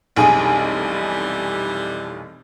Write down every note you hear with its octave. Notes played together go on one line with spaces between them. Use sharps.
F1 B1 E3 G3 D4 D#4 G#4 G#5